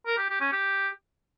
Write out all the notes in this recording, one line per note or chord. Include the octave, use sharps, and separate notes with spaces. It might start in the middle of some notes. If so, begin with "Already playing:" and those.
A#4
G4
G4
C#4
G4